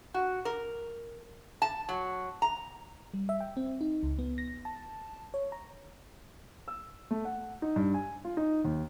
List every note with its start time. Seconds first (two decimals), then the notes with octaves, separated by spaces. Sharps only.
0.14 F#4
0.45 A#4
1.62 A5
1.89 F#3
2.42 A#5
3.14 G3
3.29 E5
3.40 G5
3.57 C4
3.81 D#4
4.03 C#2
4.19 B3
4.38 A#6
4.65 A5
5.34 C#5
5.52 A#5
6.68 E6
7.11 A3
7.25 F#5
7.62 D#4
7.76 G2
7.94 G#5
8.25 F4
8.37 D#4
8.64 D#2